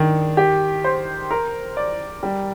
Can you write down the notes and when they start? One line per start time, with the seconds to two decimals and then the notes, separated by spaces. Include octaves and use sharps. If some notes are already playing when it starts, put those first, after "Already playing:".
Already playing: D#3 D4
0.37 G4
0.84 C5
1.31 A#4
1.77 D5
2.23 G3